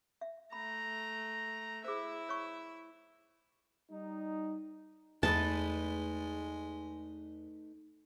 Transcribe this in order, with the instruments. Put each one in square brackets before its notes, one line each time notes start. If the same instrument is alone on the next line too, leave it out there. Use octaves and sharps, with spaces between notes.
[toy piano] E5
[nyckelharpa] A3 A#5 [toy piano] B5
[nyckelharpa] E4 E5 [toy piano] G#4 C5
[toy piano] C#5 C#6
[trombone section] G3 D#4
[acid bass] E2 [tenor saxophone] G#3 [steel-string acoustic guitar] A3 D#4 B4 [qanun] A5